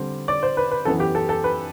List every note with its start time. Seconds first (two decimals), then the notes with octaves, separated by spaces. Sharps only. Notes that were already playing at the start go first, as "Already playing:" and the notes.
Already playing: D3 G3 C4
0.28 D5
0.43 C5
0.57 B4
0.71 B4
0.85 F#2 E3 B3 A4
1.00 G4
1.15 A4
1.29 A4
1.44 B4